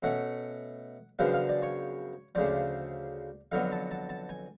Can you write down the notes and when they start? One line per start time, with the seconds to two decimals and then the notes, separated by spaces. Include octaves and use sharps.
0.03 B2 A3 C#4 F#5
1.19 F#2 C#3 F3 B3 D4 F5
1.34 F5
1.49 D5
1.62 C#5
2.35 D2 C#3 F3 D5
3.52 F2 D3 F#3 B3 F5
3.72 A5
3.91 A5
4.09 A5
4.29 G#5